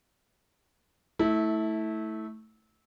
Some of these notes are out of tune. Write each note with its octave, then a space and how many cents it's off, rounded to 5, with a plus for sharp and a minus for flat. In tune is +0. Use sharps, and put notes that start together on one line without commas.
A3 +0 E4 -20